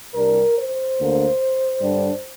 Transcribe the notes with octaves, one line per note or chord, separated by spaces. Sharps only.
C2 C3 G3 D4 A#4
C5
D2 D3 A#3
G2 D3 G3 D4